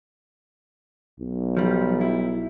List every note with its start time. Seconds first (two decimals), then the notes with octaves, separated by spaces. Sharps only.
1.20 B1
1.57 F3 G3
2.01 E4